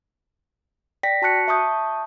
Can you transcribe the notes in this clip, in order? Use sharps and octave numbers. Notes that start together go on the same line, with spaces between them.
D5 G5 A#6 B6
F#4 A5 C#6 F#6 C#7
E5 A5 C#6 D#6 G6